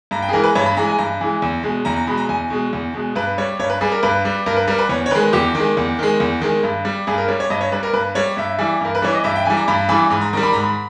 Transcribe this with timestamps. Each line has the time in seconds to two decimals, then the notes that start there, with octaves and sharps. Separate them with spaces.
0.11 G2 A#5
0.22 G5
0.29 G#4
0.33 E3 G#3 A#4
0.44 B4
0.55 G2 C#5
0.66 B5
0.77 E3 G#3 A#5
0.88 G#5
0.98 G2 A#5
1.21 E3 G#3
1.42 E2
1.63 B2 G#3
1.85 E2 A#5
1.96 A#5
2.07 B2 G#3 B5
2.17 A#5
2.29 E2 G#5
2.50 B2 G#3
2.73 E2
2.94 B2 G#3
3.15 G2 B4
3.38 G3 C#5
3.59 G2 C#5
3.70 B4
3.81 G3 G#4
3.92 A#4
4.03 G2 B4
4.25 G3
4.46 G2 A#4
4.56 B4
4.68 G3 A#4
4.78 B4
4.89 E2 C#5
5.06 C#5
5.11 D#3 G#3 B4
5.33 E2 G4
5.55 D#3 G#3
5.77 E2
5.99 D#3 G#3
6.20 E2
6.41 D#3 G#3
6.63 G2
6.85 G3
7.07 G2 G#4
7.18 A#4
7.28 G3 C#5
7.40 C#5
7.50 G2 D#5
7.61 C#5
7.72 G3 B4
7.83 A#4
7.93 G2 B4
8.15 G3 C#5
8.37 G2 E5
8.59 E3 G3
8.81 G2 A#4
8.95 B4
9.02 E3 G3 C#5
9.14 D#5
9.24 G2 E5
9.36 G5
9.45 E3 G3 G#5
9.57 A#5
9.68 G2 B5
9.89 E3 G3 B5
10.10 G#2 B5
10.21 A#5
10.33 D#3 G3 A#5
10.43 B5
10.53 G#2 A#5
10.63 B5